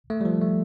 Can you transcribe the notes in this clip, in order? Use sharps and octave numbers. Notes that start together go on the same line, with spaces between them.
A3
G3
F3
A3